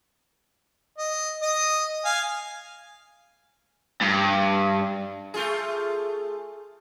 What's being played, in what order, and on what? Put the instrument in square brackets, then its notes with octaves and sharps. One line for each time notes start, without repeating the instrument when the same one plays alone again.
[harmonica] D#5
D#5 D#6
F5 G#5
[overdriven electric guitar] G2
[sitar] A3 F4 G#4